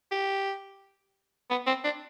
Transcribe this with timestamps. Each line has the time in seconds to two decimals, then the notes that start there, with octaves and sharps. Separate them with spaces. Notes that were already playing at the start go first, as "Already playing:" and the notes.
0.12 G4
1.50 B3
1.67 C4
1.84 D4